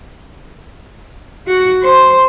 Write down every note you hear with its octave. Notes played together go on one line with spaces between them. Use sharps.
F#4
C5